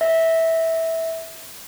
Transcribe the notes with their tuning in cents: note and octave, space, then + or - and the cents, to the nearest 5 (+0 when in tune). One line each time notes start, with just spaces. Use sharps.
E5 -15